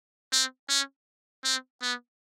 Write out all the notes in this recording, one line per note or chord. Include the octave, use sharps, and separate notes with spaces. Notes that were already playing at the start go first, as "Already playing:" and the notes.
C4
C#4
C4
B3